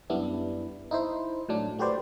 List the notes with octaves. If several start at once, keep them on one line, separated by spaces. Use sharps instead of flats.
F#2 G3 B3 D4 E4
D#4 E4 C5
A2 F#3 D4
A3 F#4 G4 B4 C5 D5